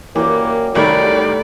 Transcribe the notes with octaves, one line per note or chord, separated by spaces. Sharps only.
F#2 E3 A#3 G4 D5
C2 D#3 G3 A3 A#4 B4 D5 B5